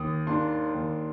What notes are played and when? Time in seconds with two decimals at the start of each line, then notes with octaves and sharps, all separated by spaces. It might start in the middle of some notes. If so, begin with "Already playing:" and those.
Already playing: D#2 D#6
0.27 D#3 A#3 D4 C6
0.75 D#2